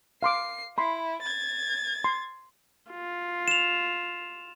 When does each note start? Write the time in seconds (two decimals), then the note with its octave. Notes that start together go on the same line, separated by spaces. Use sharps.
0.23 F5 C6 D6 C7
0.78 E4 B5 C6
1.22 G#6 A6
2.04 C6
2.91 F4
3.48 E7 F7